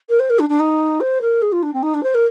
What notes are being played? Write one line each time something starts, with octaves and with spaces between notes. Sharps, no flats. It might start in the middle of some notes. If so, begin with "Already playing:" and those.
A#4
C5
A#4
D4
D4
D#4
C5
A#4
G#4
F4
D4
C4
D#4
D4
C5
A#4